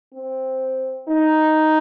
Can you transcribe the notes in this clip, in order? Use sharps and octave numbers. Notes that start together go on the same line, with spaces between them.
C4
D#4